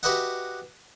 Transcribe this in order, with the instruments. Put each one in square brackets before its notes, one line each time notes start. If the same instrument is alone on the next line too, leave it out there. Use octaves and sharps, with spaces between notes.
[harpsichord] F#4 G4 B4 D#5 E5 F#5